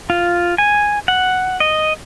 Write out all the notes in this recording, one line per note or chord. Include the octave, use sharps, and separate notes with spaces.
F4
G#5
F#5
D#5